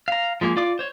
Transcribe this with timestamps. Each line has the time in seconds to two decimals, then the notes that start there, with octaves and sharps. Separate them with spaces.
0.08 F5 A#5
0.41 F3 G#3 A#3 G#4
0.56 F4 D5 D6
0.79 C5 C#5